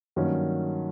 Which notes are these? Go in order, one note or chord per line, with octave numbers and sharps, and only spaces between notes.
G2 D#3 F#3 A#3 C#4